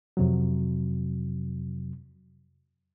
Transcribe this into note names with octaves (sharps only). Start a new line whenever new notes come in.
F2 C3 F#3